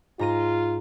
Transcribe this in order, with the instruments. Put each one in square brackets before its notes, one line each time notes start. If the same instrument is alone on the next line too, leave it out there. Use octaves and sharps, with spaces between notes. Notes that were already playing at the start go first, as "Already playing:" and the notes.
[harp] G#2 A#5 D#7 [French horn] F4